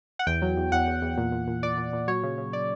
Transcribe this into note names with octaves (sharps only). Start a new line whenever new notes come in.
F#5
E2 G5
F#3
E2
E2 F#5
E2
E2
A#2
A#2
A#2
A#2 D5
A#2
A#2
F#3 C#5
C#3
C#3
D5